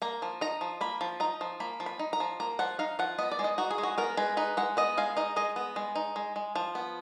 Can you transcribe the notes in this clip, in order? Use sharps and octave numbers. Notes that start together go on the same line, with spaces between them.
A#3 A#5
F3
D#4 A#5
F3
A#3 B5
F3
D#4 A#5
F3
A#3 B5
F3
B5
D#4
A#5
F3
A#3 A#5
F3 F#5
D#4 F5
F3 F#5
B3 D#5
D5
G#3
D#5
D#4 F#4
G#4
G#3
F#4
B3 A#4
G#3 B4
D#4 B4
G#3 F#5
B3 D#5
G#3 F5
D#4 D#5
G#3 D#5
B3
G#3
D#4
G#3
G#3
F3
B3